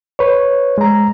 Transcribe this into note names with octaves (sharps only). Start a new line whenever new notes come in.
B4 C#5
G#3 A#5